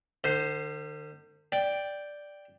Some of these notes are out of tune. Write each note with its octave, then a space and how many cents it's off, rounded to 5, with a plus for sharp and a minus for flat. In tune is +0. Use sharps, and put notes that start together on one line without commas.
D3 +45 C5 +0
D5 +0 G5 +0